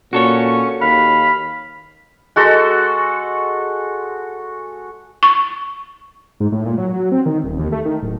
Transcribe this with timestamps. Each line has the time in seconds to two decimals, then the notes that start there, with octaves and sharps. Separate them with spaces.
0.13 A#2 C#4 F#4 A4 C#5
0.81 D#2 F5 B5
2.36 G#3 F#4 A4
5.23 C#6
6.40 G#2
6.52 A2
6.65 A#2
6.78 F#3
6.94 F#3
7.12 C4
7.26 D#3
7.44 D#1
7.59 D#2
7.72 A3
7.85 D#3
8.02 D1